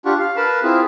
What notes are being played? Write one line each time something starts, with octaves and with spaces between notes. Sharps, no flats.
D4 F4 G4 F#5 C#6
F5
A#4 B4 A5 B5
C4 E4 F4 G#4